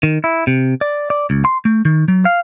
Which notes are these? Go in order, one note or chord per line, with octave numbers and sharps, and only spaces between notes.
D#3
E4
C3
D5
D5
C#2
C6
A3
D#3
F#3
F5